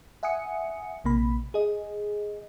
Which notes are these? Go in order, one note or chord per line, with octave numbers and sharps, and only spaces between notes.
E5 F#5 G#5 D#6 C#7
A#1 C3 A#3 B5
G#4 D#5